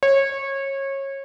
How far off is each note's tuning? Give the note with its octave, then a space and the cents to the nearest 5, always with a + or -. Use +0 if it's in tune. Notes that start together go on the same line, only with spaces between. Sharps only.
C#5 -25